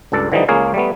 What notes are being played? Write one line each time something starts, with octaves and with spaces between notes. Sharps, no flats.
C#2 G2 A4 D5
D3 E3 F3 G3 D#4
C#2 A#3 G#4 C#5 F5
G3 A3 B3